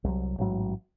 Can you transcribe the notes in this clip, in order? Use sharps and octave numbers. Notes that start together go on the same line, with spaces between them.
C2 F#3
A1 G#2 F#3